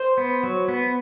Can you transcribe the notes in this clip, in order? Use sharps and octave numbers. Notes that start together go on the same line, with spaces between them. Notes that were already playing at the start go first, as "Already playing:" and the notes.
Already playing: C5
B3
F#3
B3